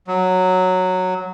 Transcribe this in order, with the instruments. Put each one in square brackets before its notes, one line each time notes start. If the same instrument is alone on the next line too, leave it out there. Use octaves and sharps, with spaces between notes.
[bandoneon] F#3